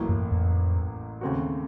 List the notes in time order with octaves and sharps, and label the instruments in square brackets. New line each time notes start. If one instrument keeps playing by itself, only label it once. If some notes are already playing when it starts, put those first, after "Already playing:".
Already playing: [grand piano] A1 A2 F#3 A#3
[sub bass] F#2
F2
[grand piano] D#2 C#3 A3 C4 F#4